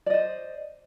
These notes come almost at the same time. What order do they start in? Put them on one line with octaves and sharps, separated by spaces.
D5 D#5 C5